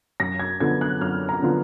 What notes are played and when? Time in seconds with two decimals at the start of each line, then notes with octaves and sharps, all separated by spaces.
0.20 F#2 A#6
0.39 G#6
0.60 D3 F3 B3 G#6
0.81 F#6
1.01 F#2 F6
1.29 A#5
1.42 D3 F3 B3